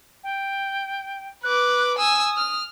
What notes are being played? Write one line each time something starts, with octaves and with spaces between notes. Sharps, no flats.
G5
B4 D6 F#6
G#5 D#6 E6
F6